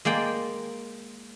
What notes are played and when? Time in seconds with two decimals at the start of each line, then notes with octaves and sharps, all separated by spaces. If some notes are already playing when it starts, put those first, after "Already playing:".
0.05 G#3 A#3 D5 G5